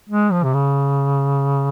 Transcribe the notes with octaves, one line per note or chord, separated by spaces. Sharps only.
G#3
F3
C3
C#3